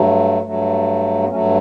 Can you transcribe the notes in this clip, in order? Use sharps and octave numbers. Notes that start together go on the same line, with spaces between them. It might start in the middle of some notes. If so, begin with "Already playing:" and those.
Already playing: G2 F#3 A3
G2 F#3 A3
B3
G2 F#3 A3 C#4